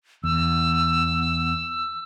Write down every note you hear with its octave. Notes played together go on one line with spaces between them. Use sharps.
E2 E6